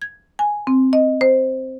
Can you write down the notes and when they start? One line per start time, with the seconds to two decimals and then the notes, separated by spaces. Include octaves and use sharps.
0.02 G#6
0.39 G#5
0.67 C4
0.93 D#5
1.21 C5